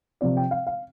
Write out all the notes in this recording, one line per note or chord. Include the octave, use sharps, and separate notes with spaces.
C3 F3 C4 D5
G5
F5
F5